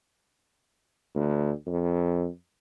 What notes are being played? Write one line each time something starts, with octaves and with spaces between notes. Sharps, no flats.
D2
F2